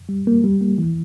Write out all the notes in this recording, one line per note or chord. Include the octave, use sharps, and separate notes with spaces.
G3
A#3
G3
A#3
E3